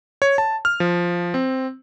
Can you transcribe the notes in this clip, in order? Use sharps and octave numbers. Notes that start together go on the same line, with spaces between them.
C#5
A5
F6
F3
C4